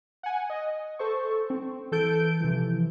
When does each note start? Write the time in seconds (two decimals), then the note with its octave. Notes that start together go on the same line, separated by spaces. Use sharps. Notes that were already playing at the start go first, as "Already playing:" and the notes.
0.23 F#5 G#5
0.50 D#5
0.99 A4 C5 C#6
1.50 C4
1.92 E3 A4 G6 D7
2.41 C3 E3 F3